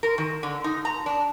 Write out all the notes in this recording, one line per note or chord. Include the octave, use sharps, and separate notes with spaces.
A#4
D#3
D3
D#4
A#5
D4